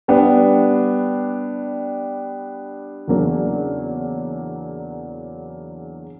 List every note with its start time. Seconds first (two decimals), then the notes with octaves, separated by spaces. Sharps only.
0.08 G3 B3 D4
3.07 E2 C#3 F#3 A#3 D4